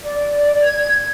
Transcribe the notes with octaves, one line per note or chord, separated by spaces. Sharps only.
D5
G#6